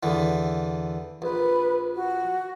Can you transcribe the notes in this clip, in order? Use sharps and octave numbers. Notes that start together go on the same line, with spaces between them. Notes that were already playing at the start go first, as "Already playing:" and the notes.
E2 D3 E3
A#1 B4
F#4